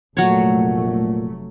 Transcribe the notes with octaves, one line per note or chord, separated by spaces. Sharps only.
F1 A#2 F#3 A3 C#5